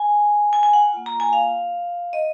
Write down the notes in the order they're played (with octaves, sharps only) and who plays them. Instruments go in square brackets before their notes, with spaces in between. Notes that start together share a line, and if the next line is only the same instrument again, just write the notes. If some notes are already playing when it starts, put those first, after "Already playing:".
Already playing: [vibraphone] G#5
G#5
G#5
F#5
A#3 F4
A#5
G#5
F5
D#5